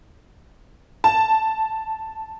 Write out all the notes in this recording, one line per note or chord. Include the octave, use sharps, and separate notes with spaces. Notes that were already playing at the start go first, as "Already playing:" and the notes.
A5